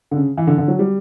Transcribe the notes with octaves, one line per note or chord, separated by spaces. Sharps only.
D3
C#3
E3
D3
D3
F#3
G3